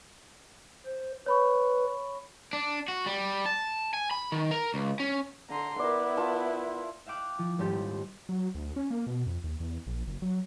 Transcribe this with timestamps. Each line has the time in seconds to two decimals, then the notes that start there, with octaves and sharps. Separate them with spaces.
0.85 C5
1.26 B4 C#5 B5 C#6
2.53 D4
2.88 F#4
3.06 G3
3.46 A5
3.94 G#5
4.11 B5
4.32 D#3
4.51 A#4
4.74 C#2
5.00 C#4
5.50 D3 A#5 C6
5.79 B3 E4 A#4 D5
6.17 F4 A5
7.06 E5 F5 G5 D6 F#6
7.39 F3
7.59 D#1 D#2 G#2 G4 A4
8.29 F#3
8.55 D2
8.76 C#4
8.91 A#3
9.07 B2
9.26 F2
9.44 D#2
9.60 E2
9.87 A#1
10.08 F#1
10.22 F#3